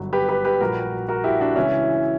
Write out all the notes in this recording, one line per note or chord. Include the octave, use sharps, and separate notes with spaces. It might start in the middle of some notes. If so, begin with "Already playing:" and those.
Already playing: G1 G2 F#3
G4 B4
G4 B4
G4 B4
A#1 A#2 G3 F#4 A#4
F#4 A#4
E4 G4
D4 F#4
C#2 C#3 E3 C#4 E4